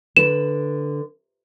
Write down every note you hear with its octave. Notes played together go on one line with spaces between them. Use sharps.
D3 B4 E7